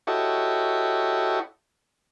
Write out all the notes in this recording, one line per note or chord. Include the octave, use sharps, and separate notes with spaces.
E4 F#4 G4 A4 C#5 D#5